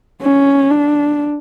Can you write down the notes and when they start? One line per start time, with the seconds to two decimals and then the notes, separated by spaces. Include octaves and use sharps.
0.22 C#4
0.70 D4